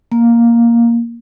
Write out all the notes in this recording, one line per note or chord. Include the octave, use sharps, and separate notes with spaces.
A#3